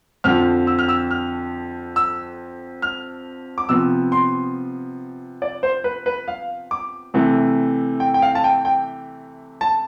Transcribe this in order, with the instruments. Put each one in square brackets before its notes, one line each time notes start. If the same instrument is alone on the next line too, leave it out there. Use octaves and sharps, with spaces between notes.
[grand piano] F2 D3 F3 F6
E6
F6
E6
F6
E6
F6
D6
C3 F3 B3 E6
C6
D5
C5
B4
B4
F5
D6
C3 E3 A3
G5
G5
F5
A5
G5
G5
A5